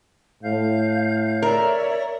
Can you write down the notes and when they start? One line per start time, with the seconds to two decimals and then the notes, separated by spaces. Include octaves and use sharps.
0.43 A2 F5 G6
1.42 A#4 C#5 D5 E5